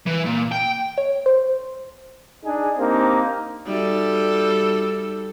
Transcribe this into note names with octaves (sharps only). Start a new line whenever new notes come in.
E3
A#2
G5
C#5
C5
D4 D#4 G#4
A#3 C4 D4 D#4 G4
G3 D#4 F#4 A4 E5